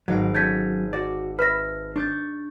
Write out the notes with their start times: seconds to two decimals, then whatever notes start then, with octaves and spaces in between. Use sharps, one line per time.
0.08 G#1 G#2 F#3 F5 D7
0.35 F#3 C#4 A4 G6 G#6 B6
0.93 F#4 D5
1.39 B4 E5 B5 F6 A#6
1.96 D4 C#6 G6 A6